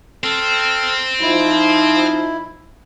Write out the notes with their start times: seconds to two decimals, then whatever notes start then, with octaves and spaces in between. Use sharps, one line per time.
0.24 C4 A4 F6
1.21 F3 D#4 E4